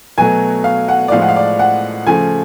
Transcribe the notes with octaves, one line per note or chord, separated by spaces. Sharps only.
B2 F#3 A3 G#5
F5
F#5
D5
A2 F3 G#3 F5
F#5
F5
D5
F#5
C#3 F3 A3 G#5